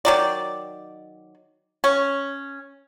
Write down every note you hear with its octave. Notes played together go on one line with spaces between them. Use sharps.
D#3 F#3 D5
C#4